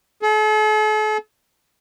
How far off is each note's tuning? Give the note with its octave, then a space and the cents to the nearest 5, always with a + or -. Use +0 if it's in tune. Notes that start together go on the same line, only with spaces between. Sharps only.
A4 -45